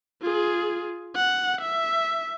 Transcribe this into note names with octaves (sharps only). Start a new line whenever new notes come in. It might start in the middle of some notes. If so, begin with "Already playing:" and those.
F4 G#4
F#5
E5